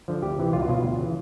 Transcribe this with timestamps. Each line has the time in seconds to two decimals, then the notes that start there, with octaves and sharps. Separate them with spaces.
0.08 D3 F3
0.22 D2 G4
0.38 C3 E3
0.53 C#2 F4
0.61 F#4
0.68 B2 F4
0.84 D2
0.99 C#3 E3